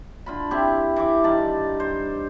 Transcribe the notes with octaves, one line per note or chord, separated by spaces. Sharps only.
D3 F4 B5
C4 E4 G4
E3 E5 D6
G2 D#3 A5
C5